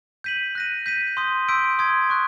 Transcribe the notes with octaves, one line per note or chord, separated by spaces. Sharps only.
G6 B6 D#7 F#7
F#6 A#6 D#7
G6 B6 D#7
C6 D#6 G6
C6 E6 G6 B6 D7
C6 D#6 G#6
C#6 F#6